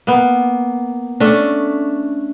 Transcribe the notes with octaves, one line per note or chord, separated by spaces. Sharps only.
A#3 B3
A3 C#4 D4